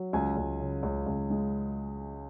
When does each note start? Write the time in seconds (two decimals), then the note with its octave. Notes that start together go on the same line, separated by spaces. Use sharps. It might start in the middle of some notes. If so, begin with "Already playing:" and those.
Already playing: F#3
0.13 C#2 G#5
0.37 C#2
0.60 C#3
0.83 C#2
1.06 C#2
1.30 G#3